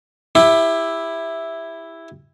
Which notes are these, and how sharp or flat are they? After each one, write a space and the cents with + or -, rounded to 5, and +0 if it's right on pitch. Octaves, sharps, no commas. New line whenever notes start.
E4 +0 G4 +25